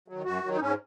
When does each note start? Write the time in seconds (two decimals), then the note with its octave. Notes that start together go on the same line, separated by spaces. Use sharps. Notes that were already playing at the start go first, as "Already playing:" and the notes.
0.08 D#3 F#3
0.25 F#2 F#4
0.43 D#3 F#3
0.55 D#4
0.61 G#2 C#4